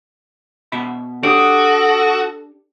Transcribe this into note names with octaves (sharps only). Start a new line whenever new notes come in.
B2 E5 B5
D4 F#4 G4 A4 C#5 D#6 D7